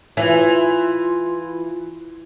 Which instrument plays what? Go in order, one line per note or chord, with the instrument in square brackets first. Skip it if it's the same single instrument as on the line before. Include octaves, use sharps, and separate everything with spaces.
[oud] E3 [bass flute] F4